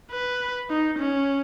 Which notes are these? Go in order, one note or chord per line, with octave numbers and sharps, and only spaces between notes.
B4
D#4
C#4